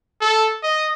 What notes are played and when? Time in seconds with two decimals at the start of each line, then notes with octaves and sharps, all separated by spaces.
0.21 A4
0.63 D#5